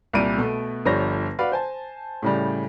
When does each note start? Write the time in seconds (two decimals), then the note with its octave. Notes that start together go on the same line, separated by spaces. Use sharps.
0.13 C2 A#2 G3 D7 D#7
0.38 B2 A3 B3
0.85 G1 F3 G3 C5 C#5 A#6
1.39 F#4 B4 D5 F5
1.52 C5 G#5 A5
2.22 A2 C#3 G3